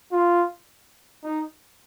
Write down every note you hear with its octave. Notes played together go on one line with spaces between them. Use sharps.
F4
D#4